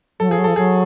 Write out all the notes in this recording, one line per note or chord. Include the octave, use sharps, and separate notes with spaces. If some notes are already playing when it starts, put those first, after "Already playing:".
F#3 A4
F3
G#4
F#3
F3 A4
F#3 G#4